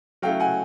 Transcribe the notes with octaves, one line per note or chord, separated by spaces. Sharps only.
F#3 A3 C#4 E4 F5 G5
F#5 G#5